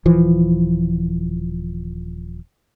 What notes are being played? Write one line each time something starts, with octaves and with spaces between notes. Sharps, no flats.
D#1 E3 F3